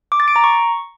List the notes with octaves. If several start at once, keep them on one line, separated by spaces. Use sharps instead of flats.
D6
A6
D7
A#5
C#6